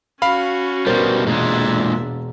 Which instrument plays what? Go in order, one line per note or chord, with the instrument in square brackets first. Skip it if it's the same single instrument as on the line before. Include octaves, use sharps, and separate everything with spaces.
[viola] C#4 F#4 [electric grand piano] F5 B5
[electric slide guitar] B2 G3 [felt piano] A#4 C5
[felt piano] E1 [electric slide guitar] A#2 G#3 [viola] D4 E5